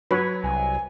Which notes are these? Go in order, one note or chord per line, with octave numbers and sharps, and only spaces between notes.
F#3 B4 C#5
C2 G#5